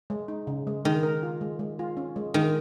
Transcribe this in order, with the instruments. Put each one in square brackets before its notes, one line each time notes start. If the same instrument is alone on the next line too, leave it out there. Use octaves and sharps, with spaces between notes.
[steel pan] G#3
D#4
C#3
G#3
[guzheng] D#3 [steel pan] G#3
[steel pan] A#4
F4
G#3
G#3
F4
C#4
G#3
[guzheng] D#3 [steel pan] G#3